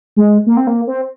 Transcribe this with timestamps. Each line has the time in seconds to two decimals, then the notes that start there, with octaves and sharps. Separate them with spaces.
0.16 G#3
0.46 A#3
0.57 C4
0.67 A#3
0.87 C4